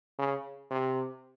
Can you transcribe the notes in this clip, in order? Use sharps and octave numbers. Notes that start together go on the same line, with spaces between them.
C#3
C3